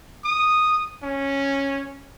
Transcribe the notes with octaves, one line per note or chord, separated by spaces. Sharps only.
D#6
C#4